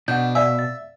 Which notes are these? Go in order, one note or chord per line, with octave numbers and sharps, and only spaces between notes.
B2 D4 F#5 G6
D5 E5 F5 G#5
A6